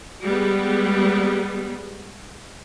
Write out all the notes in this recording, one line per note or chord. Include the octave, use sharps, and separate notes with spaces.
G3 G#3 B3